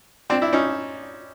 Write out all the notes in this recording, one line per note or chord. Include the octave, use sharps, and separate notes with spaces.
C4 D4
D4 E4
C#4 D#4